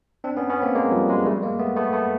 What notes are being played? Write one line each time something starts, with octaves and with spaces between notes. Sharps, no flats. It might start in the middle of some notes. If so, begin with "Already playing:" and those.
C4 D4
B3 C#4
B3 C#4
A#3 C4
G#3 A#3
F3 G3
F#3 G#3
G3 A3
G#3 A#3
A3 B3
A3 B3
A3 B3